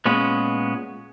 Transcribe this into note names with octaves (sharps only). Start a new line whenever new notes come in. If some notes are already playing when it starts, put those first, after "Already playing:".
A#2 G#3 B3 C#4